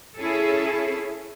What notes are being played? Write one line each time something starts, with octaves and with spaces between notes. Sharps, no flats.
C#4 E4 G#4 A4